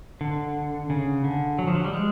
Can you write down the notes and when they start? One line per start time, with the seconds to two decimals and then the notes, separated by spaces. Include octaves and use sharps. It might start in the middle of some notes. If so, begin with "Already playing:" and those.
0.21 D3
0.90 C#3
1.24 D3
1.59 F#3
1.67 F3
1.75 F#3
1.84 G3
1.93 G#3